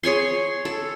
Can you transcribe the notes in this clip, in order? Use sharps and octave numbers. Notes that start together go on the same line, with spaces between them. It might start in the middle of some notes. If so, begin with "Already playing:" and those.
G#4 C#5 G#5 C6
A4